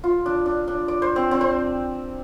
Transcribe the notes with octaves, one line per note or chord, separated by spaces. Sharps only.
F4
D4
D4
D4
D5
C5
C4
C4
C5